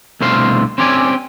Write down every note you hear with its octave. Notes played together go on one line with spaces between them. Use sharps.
C2 B2 D3 A3 C5 F5
C4 C#4 G4 C#5 D5 G#5